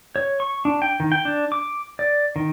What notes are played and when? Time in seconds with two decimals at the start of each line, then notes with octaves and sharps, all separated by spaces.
0.16 C#5
0.40 C#6
0.65 D4
0.82 G5
1.00 D#3
1.12 G5
1.25 D4
1.52 D6
1.99 D5
2.36 D#3